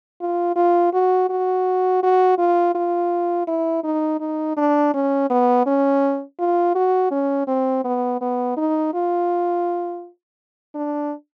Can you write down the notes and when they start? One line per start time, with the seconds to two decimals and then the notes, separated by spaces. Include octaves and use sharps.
0.20 F4
0.56 F4
0.93 F#4
1.30 F#4
2.03 F#4
2.38 F4
2.75 F4
3.47 E4
3.84 D#4
4.20 D#4
4.57 D4
4.94 C#4
5.30 B3
5.66 C#4
6.39 F4
6.75 F#4
7.11 C#4
7.48 C4
7.85 B3
8.21 B3
8.57 D#4
8.94 F4
10.75 D4